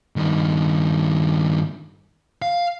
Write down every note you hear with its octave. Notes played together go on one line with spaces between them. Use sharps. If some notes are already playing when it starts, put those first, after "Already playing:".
G2 D#3
F5